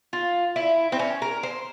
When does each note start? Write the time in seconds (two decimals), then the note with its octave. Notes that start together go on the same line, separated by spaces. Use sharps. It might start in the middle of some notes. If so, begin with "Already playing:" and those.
0.13 F4
0.56 E4
0.92 C4
0.99 C#4
1.22 A#4
1.43 C5